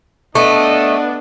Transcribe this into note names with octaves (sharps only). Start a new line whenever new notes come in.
A3 B3 D4 D#5